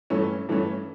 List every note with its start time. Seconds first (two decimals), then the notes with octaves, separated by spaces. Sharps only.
0.10 G2 E3 A3 C#4
0.49 G2 E3 A3 C#4